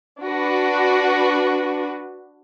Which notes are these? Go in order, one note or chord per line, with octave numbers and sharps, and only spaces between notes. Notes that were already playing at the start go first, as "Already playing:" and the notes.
D4 F#4 B4